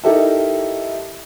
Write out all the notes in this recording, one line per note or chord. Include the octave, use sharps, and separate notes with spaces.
D#4 E4 G4 A4 A#4 E5